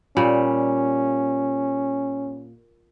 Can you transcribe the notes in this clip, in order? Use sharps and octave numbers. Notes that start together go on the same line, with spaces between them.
A#2 G3 C#4